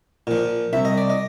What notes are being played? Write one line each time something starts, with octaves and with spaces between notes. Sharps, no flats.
A#2 F3
C2 E5
D#5
D5
D#5